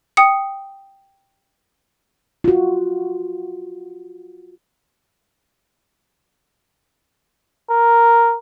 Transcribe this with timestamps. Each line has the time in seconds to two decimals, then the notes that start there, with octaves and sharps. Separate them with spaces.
0.17 G5 D#6 C#7
2.44 F4 F#4
7.71 A#4